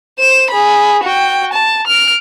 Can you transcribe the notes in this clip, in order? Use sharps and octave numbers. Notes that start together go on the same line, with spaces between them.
C5 E7
G#4 B5
F#4 G5
A5
F6 D7